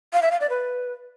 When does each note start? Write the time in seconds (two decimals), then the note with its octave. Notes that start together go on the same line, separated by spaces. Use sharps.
0.13 F5
0.22 E5
0.31 F5
0.41 D5
0.50 B4